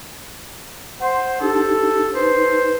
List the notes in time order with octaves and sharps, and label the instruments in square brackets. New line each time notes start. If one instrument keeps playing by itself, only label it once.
[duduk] C5 [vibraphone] F#5 C6
[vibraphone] D4 D#4 G4 [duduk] A4
[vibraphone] D#4 B4 [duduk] C5